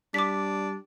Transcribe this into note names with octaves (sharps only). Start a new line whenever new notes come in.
G3 D4 D6 B6